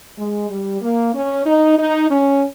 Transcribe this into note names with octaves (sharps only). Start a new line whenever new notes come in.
G#3
G3
A#3
C#4
D#4
D#4
C#4